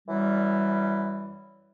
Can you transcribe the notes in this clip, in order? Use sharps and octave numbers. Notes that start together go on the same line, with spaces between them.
F#2 E3 G3